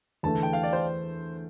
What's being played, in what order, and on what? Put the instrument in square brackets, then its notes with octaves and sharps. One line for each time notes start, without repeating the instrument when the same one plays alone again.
[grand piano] E2 D3 A3 [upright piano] A5
[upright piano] G5
F5
D5
C5